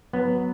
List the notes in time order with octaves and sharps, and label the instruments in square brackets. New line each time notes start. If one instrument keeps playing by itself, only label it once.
[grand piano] F#3 [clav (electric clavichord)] B3